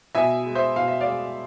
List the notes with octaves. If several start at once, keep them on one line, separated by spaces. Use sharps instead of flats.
B2 E5 G#5
G#3
C5 E5
B2 F5
E5
D5 F5
G#3